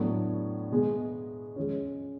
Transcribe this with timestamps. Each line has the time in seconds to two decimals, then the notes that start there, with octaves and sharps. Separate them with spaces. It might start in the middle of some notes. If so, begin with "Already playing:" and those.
Already playing: A2 F#3 B3 D4
0.71 B2 G#3 B3
1.56 F3 G#3 C#4